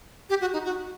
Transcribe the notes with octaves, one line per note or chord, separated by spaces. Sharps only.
G4
F#4
D#4
F#4